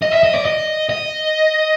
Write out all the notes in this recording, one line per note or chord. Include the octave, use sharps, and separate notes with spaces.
D#5
E5
D#5
D5
D#5
D#5